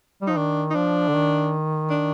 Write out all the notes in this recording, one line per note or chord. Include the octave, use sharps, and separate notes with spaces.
G3
F3 D#4
D#3 D4
D#4
F3 D4
D3
D#3
D4